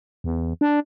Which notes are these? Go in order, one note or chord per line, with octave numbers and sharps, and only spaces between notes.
E2
D4